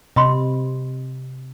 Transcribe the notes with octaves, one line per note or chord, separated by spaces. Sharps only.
C3 D#5 B5 C6